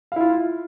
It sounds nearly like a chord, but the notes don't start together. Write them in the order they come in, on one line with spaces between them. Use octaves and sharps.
F5 E4 F4